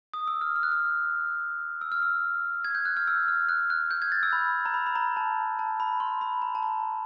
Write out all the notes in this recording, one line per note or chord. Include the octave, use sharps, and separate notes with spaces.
D#6
E6
F6
F6
F#6
F6
E6
F6
E6
G#6
G6
F#6
F6
E6
F6
F#6
F#6
G6
G#6
A6
E6
B5
A#5
B5
B5
A#5
A5
A5
B5
C6
B5
A#5
A5
A#5